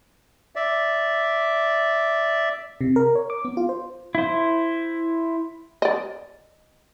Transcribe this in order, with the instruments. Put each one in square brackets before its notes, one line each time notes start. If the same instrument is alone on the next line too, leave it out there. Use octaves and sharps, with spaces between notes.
[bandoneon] D5 E5
[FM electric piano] C3
A#4
C#5
D6
B3
F4
C5
[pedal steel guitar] E4 C5
[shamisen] D5 D#5